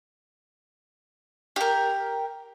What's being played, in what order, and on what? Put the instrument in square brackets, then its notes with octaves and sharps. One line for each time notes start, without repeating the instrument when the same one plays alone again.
[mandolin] G4 A#4